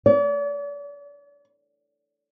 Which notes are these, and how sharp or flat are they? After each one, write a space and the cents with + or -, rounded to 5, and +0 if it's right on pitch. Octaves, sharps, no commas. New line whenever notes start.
D5 -40